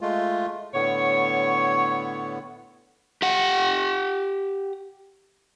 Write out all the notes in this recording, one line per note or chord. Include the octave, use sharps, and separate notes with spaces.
G#3 A3 F4
A2 D3 B3 C#5
G4 F#5